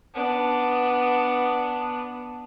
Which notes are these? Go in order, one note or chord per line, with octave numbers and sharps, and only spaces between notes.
B3 D4